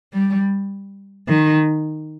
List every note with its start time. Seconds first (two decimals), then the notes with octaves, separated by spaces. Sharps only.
0.13 G3
1.28 D#3